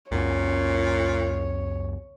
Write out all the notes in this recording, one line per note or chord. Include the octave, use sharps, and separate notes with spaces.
C#2 F#2 A#2 C#4 C#5